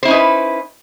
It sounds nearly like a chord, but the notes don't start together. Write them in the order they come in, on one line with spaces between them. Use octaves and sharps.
C5 E4 C#4 D#4 B4